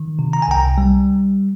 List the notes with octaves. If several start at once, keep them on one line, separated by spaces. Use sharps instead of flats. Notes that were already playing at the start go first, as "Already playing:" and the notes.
Already playing: D#3
C3
A#5
G#5
C2 G5 A#5
G3